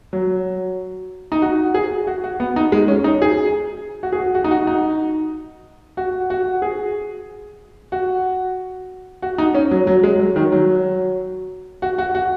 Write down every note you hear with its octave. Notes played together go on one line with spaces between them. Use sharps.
F#3
D#4
F#4
G#4
F#4
F#4
B3
D#4
G#3
C#4
D#4
G#4
F#4
G#4
F#4
F#4
D#4
F#4
D#4
F#4
F#4
G#4
F#4
F#4
D#4
C#4
F#3
F#3
G#3
F#3
D#3
F#3
F#4
F#4
F#4